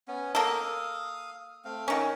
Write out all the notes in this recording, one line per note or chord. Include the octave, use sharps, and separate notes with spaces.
B3 C#4
A#3 A4 F5 D#6
A3 C4 F5
D#3 C#4